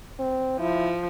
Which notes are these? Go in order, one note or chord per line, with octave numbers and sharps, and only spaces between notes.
C4
F3 E4